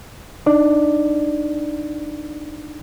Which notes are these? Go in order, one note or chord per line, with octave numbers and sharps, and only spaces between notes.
D4 D#4 D5